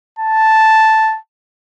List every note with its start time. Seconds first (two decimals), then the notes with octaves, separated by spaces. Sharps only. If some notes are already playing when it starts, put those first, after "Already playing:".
0.19 A5